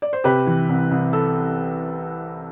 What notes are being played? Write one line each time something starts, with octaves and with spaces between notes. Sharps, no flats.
D5
C5
C3 G4 B4
E3
C2
C2
A4